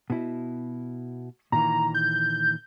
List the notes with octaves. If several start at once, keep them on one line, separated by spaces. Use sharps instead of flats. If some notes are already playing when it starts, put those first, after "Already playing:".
B2 E4
A#2 D#3 E3 A#5
G6